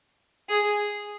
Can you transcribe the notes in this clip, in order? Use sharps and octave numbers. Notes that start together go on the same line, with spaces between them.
G#4